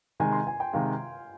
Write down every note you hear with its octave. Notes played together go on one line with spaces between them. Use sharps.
C3 D#3 G#3 G#5
C6
G#5
G5
C3 D#3 G#3 F5